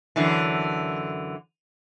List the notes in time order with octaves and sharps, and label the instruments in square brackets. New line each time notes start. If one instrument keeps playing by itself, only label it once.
[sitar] F#2 D3 E3